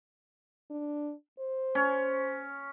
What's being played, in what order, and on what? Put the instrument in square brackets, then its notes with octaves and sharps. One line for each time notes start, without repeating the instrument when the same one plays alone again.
[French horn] D4
C5
[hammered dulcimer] C#4